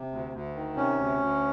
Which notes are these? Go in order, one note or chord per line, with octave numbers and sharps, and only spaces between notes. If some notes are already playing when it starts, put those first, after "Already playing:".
Already playing: C3
D2
D2
D#3
C3 C#4
D2
D2